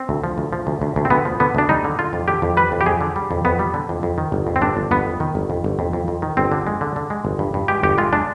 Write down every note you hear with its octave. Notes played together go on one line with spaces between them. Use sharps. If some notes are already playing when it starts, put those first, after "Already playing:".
Already playing: C4
D2
F3
D2
F3
D2
D2
D2
C4
D2 B3
F3
D3 B3
D2 D4
G3 D#4
D3
D3 F4
F2
D3 G4
F2
G3 B4
F2
G4
F2 G#4
D3
G3
F2
F2 B3
G3
D3
F2
F2
D#3
G1
F2
C4
G1 D4
G1
G1 B3
F2
D#3
G1
F2
G1
F2
F2
F2
D#3
G1 C4
D3
G#3
D3
D3
G#3
G1
G2
G2
G#3 G4
G1 G4
G#3 F4
G#3 D4